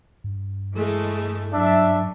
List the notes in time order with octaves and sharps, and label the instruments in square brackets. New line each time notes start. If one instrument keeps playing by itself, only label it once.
[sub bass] G2
[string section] E3 G#3 A3
[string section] F#2 [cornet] D4 [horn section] E5